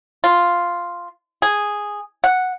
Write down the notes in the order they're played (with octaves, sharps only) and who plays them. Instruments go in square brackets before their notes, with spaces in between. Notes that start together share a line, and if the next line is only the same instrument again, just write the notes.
[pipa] F4
G#4
F#5